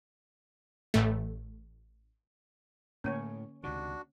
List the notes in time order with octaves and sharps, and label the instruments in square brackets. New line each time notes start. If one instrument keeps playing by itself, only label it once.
[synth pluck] A1 A3
[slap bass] A2 A3 [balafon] D3 A#3 [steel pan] C#4 C#5
[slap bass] C#2 C3 D#3 [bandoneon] D4 F#4